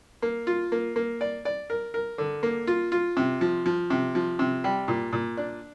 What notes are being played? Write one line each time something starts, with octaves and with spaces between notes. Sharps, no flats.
A#3
F4
A#3
A#3
D5
D5
A#4
A#4
D3
A#3
F4
F4
C3
F3
F3
C3
F3
C3
G3
A#2
A#2
D4